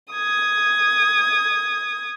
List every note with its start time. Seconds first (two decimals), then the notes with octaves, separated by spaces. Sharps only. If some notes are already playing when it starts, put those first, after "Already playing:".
0.13 D#6 G#6